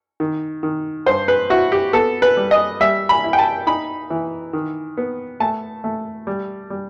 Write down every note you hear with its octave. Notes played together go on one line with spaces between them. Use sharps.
D#3
D#3
G2 C5
B4
E4 F#4
G4
B3 A4
B4
G3
D#5
G3 E5
B5
E4
G5
A5
D#4 B5
E3
D#3
B3
A3 A5
A3
G3
G3